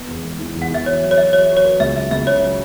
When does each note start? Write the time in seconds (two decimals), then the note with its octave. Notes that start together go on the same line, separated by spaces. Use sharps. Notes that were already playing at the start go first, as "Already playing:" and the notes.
Already playing: B3
0.08 E2
0.23 G#3
0.39 E3
0.56 E2
0.62 F#5
0.71 E3 E5
0.86 F#4 C#5
1.03 F#3
1.11 C#5
1.17 F#3 E5
1.33 F#4 C#5
1.49 F#4
1.57 C#5
1.65 B4
1.80 C#2 E5
1.96 F#3 E5
2.11 C#2 E5
2.27 C#3 C#5
2.43 F#3